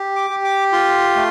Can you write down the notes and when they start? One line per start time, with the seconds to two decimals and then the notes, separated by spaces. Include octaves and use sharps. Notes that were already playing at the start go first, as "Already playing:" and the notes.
Already playing: G4
0.16 D6
0.30 G4
0.44 D6
0.73 F4 C6
1.15 A3